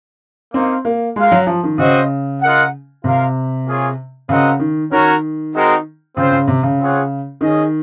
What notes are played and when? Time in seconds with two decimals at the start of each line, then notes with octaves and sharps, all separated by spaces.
0.53 A#3 C4 D#4 A#4 F5
0.85 A#3
1.16 G#3 F4 A#4 F5
1.32 F#3
1.47 F3
1.63 D#3
1.78 C#3 C4 F#4 C5 D#5
2.42 F4 A#4 D#5 F#5
3.04 C3 F4 A#4 F5
3.66 A#3 F4 G#4 C#5
4.29 C#3 C4 F#4 A#4 D#5 F#5
4.59 D#3
4.91 D#3 C#4 F#4 A#4 C#5
5.53 G#3 C4 D#4 F#4 A#4
6.16 C#3 C4 F4 C5
6.32 C#3
6.47 C3
6.63 C#3
6.78 C4 F4 G#4 C#5 F#5
7.41 D#3 C#4 G#4 D#5